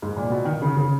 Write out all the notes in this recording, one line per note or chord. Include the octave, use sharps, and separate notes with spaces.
G#2
A#2
B2
D#3
C#3
C#3